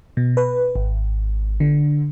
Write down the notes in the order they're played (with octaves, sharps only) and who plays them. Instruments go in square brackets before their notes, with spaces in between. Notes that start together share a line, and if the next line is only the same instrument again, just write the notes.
[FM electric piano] B2
B4
G#1
D3